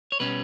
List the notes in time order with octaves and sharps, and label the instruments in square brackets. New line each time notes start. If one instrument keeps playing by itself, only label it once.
[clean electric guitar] C#5
B2 G3 C#4 B4